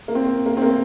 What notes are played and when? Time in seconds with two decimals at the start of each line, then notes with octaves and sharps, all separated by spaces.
0.08 A#3
0.15 C4
0.46 A#3
0.57 C4
0.62 A#3